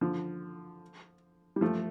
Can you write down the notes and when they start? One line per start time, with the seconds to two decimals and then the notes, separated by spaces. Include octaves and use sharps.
0.01 D3 F3
1.56 G3
1.61 F3 A3